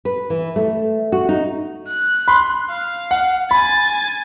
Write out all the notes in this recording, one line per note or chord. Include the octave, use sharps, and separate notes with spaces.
B4
E3
A3
F#4
D#4
F#6
B5 C6
F5
F#5
G#5 B5 A6